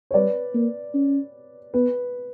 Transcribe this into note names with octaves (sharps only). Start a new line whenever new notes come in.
C#5
G3 B4 D5
A#3
C#4
B3 B4